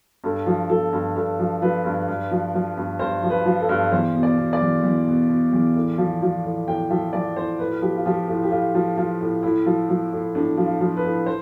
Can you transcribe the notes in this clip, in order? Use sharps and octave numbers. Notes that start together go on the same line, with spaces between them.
G2 A4
F3
F3 A4
G2
G2 A4
F3
F3 B4
G2
G2
F3
F3
G2
G2 C5
F3
B4
F3
A4
G2
E2 C5
B2
D5
B2
D5
E2
E2
B2
B2
E2
A2
F3
F3
A2
A2 G5
F3 E5
F3 D5
A2 C5
A2 B4
F3 G4
F4
F3 G4
A2 F4
G4
A2 F4
F3
F3 F4
A2
A2 E4
F3
F3
A2
A2 D4
F3
F4
F3
B4
A2
C5